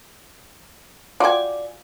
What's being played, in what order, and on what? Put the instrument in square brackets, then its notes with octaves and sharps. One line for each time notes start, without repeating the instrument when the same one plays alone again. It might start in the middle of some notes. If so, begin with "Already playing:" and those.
[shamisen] F4 F#4 G5 [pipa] D5 G#5